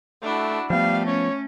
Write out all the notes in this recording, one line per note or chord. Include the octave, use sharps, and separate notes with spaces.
A3 D4 E4 F#4
F3 G3 A3 B3 F5
C#4 C#5